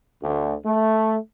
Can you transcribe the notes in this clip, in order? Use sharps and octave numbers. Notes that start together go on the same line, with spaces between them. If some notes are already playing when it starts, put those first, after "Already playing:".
D2
A3